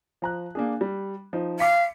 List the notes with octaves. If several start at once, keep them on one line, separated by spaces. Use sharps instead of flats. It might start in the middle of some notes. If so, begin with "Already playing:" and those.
F3 A#5 F#6
A#3 D4 G#4
G3
F3 D#4
F5 D6 B6 C#7